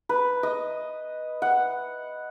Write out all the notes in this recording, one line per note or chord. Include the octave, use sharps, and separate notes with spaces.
B4
D#5
F#5